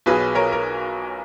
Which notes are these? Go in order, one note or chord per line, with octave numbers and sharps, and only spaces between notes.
B1 B2 F#3 G#4 B4
A#4 C#5
A#4